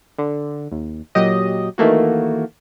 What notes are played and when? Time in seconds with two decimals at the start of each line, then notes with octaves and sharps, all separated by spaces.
0.18 D3
0.72 D#2
1.15 A#2 F#3 G4 D#5
1.78 D#3 E3 A3 A#3 F#4